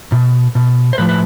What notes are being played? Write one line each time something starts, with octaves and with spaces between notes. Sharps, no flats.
B2
B2
C5
A2 F3 B4
B4